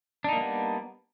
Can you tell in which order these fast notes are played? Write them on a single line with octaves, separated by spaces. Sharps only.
D4 D#4 A#3 G3 B3